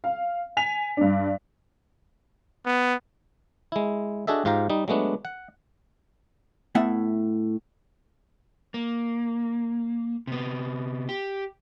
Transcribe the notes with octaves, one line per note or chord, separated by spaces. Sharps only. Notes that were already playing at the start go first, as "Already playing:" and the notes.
F5
G#5 B6 F7
G2 D4
B3
G#3 E4
D4 F#4 G#4 A4 D#5 E5
G#2 F4 G4 F5 A#5
G3 D#4
F#3 G#3 A3 B3 D4
F#5
A2 B3 E5 F#5
A#3
C3 B3
G4